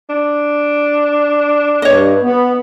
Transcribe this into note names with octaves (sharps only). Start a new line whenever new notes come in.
D4
G2 C#5 D#5
B3